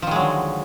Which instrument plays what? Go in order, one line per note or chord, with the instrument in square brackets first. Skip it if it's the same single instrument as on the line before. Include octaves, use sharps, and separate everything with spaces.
[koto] F3
D#3
G#3
F#3
D3